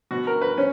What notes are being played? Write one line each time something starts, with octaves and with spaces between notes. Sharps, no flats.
B2 F#4
A#4
B4
C#4